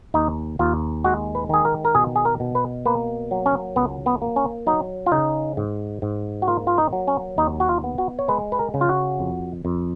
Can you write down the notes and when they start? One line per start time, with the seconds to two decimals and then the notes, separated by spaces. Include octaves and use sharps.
0.14 D#2 D#4
0.59 D#2 F4
1.04 G#3 F#4
1.35 B4
1.49 D#3 G#4
1.65 A#4
1.85 A#4
1.95 B2 G#4
2.16 G#4
2.25 A#4
2.40 B2
2.55 B4
2.85 A#3 B4
3.31 F#3
3.46 C#4
3.76 C#2 B3
4.06 B3
4.22 A#3
4.36 C#4
4.66 F#3 D#4
5.06 F4
5.12 C#3 D#4
5.57 G#2
6.02 G#2
6.42 F#4
6.48 A#3 F4
6.67 F4
6.78 D#4
6.93 F#3
7.08 C#4
7.38 D#2 D#4
7.60 F#4
7.69 F4
7.84 B3
7.98 F#4
8.19 C#5
8.28 G#3 B4
8.52 B4
8.59 A#4
8.74 C#3
8.81 F4
8.89 F#4
9.19 F2
9.65 F2